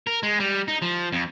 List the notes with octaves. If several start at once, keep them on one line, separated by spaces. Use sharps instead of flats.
A#4
G#3
G3
D#4
F3
F2